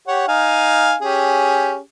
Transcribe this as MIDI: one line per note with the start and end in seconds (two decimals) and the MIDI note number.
0.07 0.25 67
0.07 0.25 73
0.07 0.25 78
0.28 0.95 63
0.28 0.95 77
0.28 0.95 80
1.01 1.78 61
1.01 1.78 67
1.01 1.78 68